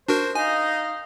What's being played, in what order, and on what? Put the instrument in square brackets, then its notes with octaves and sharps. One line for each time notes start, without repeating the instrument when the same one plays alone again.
[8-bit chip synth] D4 F#4 A#4 [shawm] C5
[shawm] D#4 [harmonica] D#5 F5 [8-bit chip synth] G#5